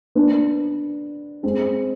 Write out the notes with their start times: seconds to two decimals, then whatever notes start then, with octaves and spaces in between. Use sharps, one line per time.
0.15 B3 D4
1.43 G#3 C4